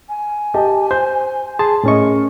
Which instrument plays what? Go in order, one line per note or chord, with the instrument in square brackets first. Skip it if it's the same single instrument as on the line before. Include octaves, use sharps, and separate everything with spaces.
[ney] G#5
[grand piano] G4 D#5 A5
[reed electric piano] C5 [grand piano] G6
[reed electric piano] G#4 A5 C6
[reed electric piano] A2 C#4 C#6 [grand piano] G#4 D#5 [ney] A#4